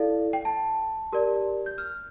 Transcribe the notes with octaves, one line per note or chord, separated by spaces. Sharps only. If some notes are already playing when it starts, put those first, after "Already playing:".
Already playing: E4 A4 D5 F5
G5
A5
G4 A#4 D5
G6
F6